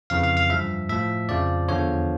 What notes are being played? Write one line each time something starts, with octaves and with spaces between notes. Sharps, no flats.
F2 C#3 E3 F5
F5
F5
G2 F3 E5
A2 F3 E5
F2 C#3 F3 D5
E2 D3 F3 C#5